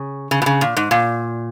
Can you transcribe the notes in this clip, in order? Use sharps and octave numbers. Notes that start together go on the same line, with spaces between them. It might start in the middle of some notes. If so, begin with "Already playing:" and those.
Already playing: C#3
C#3
B2
C#3
A#2
G#2
A#2